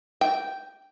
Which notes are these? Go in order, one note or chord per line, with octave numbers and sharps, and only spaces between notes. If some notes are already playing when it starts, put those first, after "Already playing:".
G5